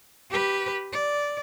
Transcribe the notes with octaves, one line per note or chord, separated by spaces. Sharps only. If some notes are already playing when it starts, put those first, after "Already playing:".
G4 B4
D5